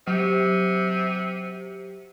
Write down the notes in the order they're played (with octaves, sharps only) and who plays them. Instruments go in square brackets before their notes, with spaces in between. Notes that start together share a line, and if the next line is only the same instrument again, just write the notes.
[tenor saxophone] C3 [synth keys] F#3 G4